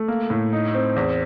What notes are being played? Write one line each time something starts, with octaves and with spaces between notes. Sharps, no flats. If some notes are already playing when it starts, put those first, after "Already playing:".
Already playing: A3
A#3
A2
D#4
C4
E2